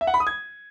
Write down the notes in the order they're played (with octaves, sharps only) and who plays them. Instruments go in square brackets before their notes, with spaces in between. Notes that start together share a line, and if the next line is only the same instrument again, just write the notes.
[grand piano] E5
F#5
B5
D#6
G#6